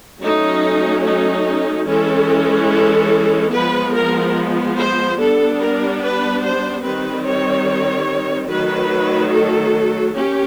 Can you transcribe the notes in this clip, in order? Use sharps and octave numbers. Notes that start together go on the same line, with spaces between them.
F#3 A3 C#4 D#4
D#4
E3 G#3 C#4 A4
A4
F3 G#3 B3 B4
A#4
C5
G3 B3 D4 A4
A#4
B4
C5
D#3 G3 C4 B4
C#5
D#3 F#3 A3 B4
A4
A#3 C#4 G4